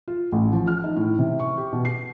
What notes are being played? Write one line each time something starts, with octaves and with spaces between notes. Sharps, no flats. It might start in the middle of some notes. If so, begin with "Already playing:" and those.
F4
A1
F3
F6
D#4
A2
C3
C#6
G4
B2
C7